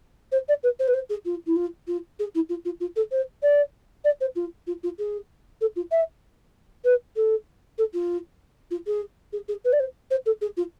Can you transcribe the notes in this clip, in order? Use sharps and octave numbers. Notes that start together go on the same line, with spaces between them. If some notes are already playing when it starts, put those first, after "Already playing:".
C5
D5
B4
C5
B4
C5
G#4
F4
E4
F4
F4
G#4
E4
F4
F4
F4
A4
C5
D5
D5
C5
F4
F4
F4
G#4
A4
F4
E5
B4
A4
A4
F4
F4
G#4
G#4
G#4
B4
D5
C5
C5
A4
G#4
F4